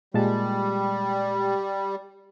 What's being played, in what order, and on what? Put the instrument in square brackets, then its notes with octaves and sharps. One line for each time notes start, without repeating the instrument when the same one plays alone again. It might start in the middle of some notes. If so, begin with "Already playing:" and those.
[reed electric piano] A#2 G#3 A5 [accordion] G3